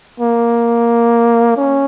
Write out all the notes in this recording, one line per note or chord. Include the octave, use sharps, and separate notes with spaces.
A#3
C#4